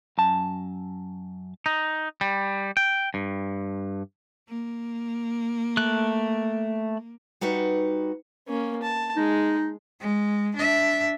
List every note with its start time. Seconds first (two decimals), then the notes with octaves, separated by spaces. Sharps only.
0.18 F#2 A5
1.66 D#4
2.21 G3
2.77 G5
3.14 G2
4.49 A#3
5.77 A3 F#6
7.41 G3 D#4 F#4 B4 F#5
8.48 A#3 C#4
8.83 A5
9.17 G#3 D#4
10.01 G#3
10.56 D4 E5